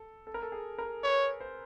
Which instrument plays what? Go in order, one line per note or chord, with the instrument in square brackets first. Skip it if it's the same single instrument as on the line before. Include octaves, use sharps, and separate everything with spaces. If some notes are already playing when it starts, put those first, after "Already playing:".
Already playing: [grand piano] A4
A4
A#4
A4
G#4
A#4
[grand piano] B4 [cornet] C#5
[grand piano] C5